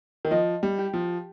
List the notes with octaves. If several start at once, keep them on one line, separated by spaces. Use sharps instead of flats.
D#3
F3 D#5
G3
G4
F3